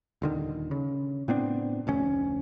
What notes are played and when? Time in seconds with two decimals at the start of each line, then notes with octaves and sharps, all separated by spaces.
0.22 D#1 D3 D#3
0.71 C#3
1.28 A2 B3 C4 D4
1.87 F1 D2 C#4